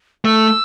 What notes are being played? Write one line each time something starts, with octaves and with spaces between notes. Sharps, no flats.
A3 E6